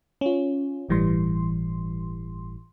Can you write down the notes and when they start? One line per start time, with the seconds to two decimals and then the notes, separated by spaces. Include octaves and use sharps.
0.21 C#4 F4
0.89 G1 A2 E3 G3 C6